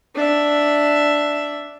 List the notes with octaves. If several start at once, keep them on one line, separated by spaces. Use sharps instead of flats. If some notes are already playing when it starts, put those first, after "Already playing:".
D4 E5